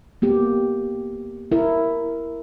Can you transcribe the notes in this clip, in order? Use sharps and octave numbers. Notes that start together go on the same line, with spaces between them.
A#3 B3 G4
E4 A#4